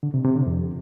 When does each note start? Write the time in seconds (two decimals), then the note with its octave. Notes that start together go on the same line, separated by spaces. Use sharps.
0.03 D3
0.14 C3
0.25 C3
0.36 D3
0.47 F2